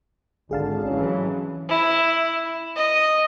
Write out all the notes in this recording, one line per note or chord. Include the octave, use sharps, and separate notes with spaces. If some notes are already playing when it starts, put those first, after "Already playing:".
G#1 D3 G#4 F5 A5
E3 F#3 G#3 C#4
E4
D#5